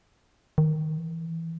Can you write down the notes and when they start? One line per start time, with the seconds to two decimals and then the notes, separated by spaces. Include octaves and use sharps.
0.58 D#3
0.98 E3